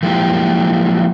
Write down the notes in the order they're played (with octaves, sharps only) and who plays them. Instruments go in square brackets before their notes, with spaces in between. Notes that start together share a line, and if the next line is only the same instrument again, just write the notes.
[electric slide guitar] F3 F#3 G#3 A#3 E4 G4